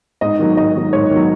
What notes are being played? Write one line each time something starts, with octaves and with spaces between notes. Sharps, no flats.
G#2 D#5
D#3 F#3
G#2 D#5
D#3 F#3
G#2 C#5
D#3 F#3